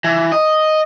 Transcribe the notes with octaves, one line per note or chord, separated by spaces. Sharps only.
E3
D#5